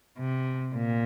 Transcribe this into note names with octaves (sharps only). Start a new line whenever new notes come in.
C3
A#2